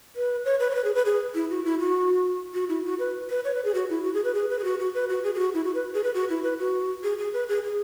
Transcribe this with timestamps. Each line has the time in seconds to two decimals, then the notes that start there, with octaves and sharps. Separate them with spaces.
0.16 B4
0.45 C#5
0.60 B4
0.71 C#5
0.75 B4
0.85 G#4
0.95 B4
1.06 G#4
1.35 E4
1.50 F#4
1.65 E4
1.80 F#4
2.54 F#4
2.69 E4
2.85 F#4
2.99 B4
3.30 B4
3.45 C#5
3.54 B4
3.65 G#4
3.74 F#4
3.90 E4
4.04 F#4
4.14 G#4
4.24 B4
4.35 G#4
4.50 B4
4.59 G#4
4.64 F#4
4.79 F#4
4.94 B4
5.09 F#4
5.24 G#4
5.34 G#4
5.39 F#4
5.54 E4
5.65 F#4
5.75 B4
5.94 G#4
6.04 B4
6.14 F#4
6.30 E4
6.43 B4
6.59 F#4
7.04 G#4
7.18 G#4
7.33 B4
7.49 G#4
7.64 G#4